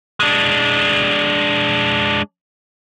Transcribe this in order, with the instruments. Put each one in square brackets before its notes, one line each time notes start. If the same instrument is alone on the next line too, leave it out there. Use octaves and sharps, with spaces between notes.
[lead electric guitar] G#3 D4